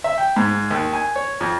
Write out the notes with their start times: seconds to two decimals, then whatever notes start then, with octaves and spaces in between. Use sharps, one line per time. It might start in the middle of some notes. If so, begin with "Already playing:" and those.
0.04 E5
0.18 G5
0.36 G#2
0.71 D#2
0.93 G#5
1.16 C#5
1.41 F2